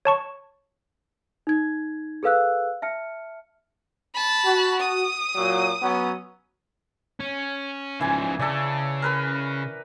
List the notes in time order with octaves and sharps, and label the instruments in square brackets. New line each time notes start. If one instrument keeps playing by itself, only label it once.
[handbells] C#5 A5 C#6
[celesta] D#4 G#6
G#4 A4 B4 F5 E6 F#6
E5 A5 F6 C#7
[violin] A5 B5
[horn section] F#4
[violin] D#6
[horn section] A#2 F#3
F#3 B3 C#4
[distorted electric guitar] C#4
[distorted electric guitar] C#3 F3 [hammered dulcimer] E3 G#5
[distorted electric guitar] C#3 [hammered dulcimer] A4 D5
[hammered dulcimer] A#4 B4 B5